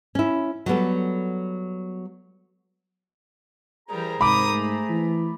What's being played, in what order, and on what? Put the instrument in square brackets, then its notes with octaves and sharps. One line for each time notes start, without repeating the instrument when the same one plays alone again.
[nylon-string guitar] C#4 E4
F#3 G3 B3 A4
[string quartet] E3 G3 A#4 [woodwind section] G#4 C5 A#5
[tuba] G#2 [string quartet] C3 A#4 D#6 [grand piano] B5 D6
[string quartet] A3
[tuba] E3